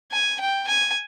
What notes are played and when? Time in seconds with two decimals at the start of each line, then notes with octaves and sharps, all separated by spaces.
0.11 G#5
0.40 G5
0.68 G#5